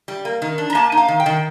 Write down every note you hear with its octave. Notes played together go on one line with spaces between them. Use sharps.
G3
A#3
D#3
D4
A#5
A#3 A5
D#4
F5
D#3
G5
D#3